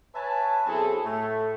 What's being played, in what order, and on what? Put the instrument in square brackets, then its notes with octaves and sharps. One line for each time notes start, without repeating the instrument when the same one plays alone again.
[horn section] B4 C#5 E5 G#5 A5
B2 F#3 C4 E4 G#4 A4
A2 A3